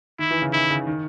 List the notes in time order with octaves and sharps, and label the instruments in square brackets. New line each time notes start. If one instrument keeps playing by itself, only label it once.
[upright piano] D#3 [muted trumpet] E4
[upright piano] E3
C#3
[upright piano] D#3 [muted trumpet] E4
[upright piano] C#3
D#3